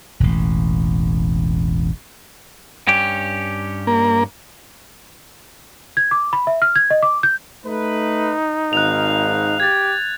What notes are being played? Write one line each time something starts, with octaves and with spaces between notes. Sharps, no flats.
E1 A1
G2 C#4 G4
A#3
G#6
D6
B5
E5
F6
G#6
D#5
D6
G6
A3 D#4 B4
G#1 F5 F#6 F7
G4 G#6 A6